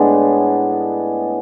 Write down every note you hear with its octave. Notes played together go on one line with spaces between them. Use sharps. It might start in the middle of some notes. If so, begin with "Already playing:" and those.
Already playing: A2 G#3 B3 D4